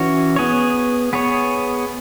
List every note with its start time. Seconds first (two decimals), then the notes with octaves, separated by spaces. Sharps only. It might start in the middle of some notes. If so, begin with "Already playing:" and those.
Already playing: E3 C#4 F#4 C#5
0.36 B3 G#4 C#5
1.13 B3 G#4 C#5